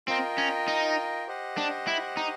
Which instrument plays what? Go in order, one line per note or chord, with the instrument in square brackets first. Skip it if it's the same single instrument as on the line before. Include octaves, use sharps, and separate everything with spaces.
[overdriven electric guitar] C4 [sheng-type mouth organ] F4 A#4 D#5 G5
[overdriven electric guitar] C#4
D#4
[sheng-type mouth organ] G4 C5 D#5 F#5
[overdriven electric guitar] D4
E4
D#4